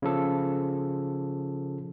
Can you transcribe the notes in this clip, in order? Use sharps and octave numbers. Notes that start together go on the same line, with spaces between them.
C#3 F3 A4